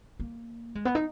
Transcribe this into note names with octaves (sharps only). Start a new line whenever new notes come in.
A#3
G#3
B3
D#4